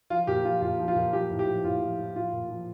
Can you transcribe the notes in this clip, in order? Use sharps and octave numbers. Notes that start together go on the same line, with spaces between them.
F3 F4
A#2 G4
F3 F4
A#2 F4
F3
F4
A#2
F3 G4
A2
G4
F3
A2 F4
F3
A2
F3 F4
A#2
F3